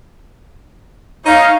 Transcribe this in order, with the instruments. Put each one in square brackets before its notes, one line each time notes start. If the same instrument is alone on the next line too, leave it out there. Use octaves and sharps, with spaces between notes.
[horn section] D#4 [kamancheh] C#5 F5